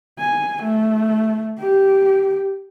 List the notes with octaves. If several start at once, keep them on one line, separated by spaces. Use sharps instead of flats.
G#5
A3
G4